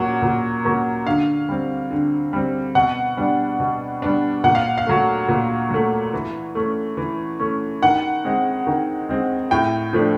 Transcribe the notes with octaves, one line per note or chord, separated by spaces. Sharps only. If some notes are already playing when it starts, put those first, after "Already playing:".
Already playing: A#2 F#3 A#3 C#4 F#5
A#2
F#3 A#3 C#4
D3 F5
G3 C4
D3
G3 C4
B2 F#5
G3 B3 D4
B2
G3 B3 D4
A#2 F#5
F5
F5
F#3 A3
A#2
F#3 A3
E3
A3 C#4
E3
A3 C#4
D#3 F#5
G#3 C4
D#3
G#3 C4
A2 G5
F3 A3 D4